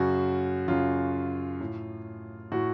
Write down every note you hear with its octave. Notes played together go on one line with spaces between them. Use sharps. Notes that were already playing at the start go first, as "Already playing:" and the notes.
Already playing: F#2 C#3 F#4
F#2 C#3 F4
A2
A2 F#4